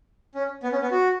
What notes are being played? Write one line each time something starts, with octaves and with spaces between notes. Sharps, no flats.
C#4
B3
C#4
B3
F#4